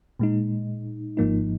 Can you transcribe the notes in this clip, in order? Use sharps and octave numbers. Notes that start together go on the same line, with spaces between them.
A#2 G#3 D#4
G#1 G#2 F3 A#3 D#4